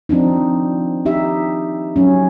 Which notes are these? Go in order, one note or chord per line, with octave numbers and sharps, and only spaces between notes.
F3 C4 D4 D#4
D#4 G4 E5
F#3 C#4